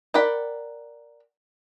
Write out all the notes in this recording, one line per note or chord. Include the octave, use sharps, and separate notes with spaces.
A#4 D5 F#5 G5 B5